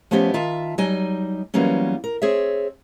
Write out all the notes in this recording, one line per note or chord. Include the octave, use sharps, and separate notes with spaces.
F3 A3 B3 C#4 G4 D#5
D#3 F4 E5 A5
F#3 G3 D#4 D#5 G#5
E3 F#3 G3 A#3 B3 C#4
A#4
C4 G#4 C#5 E5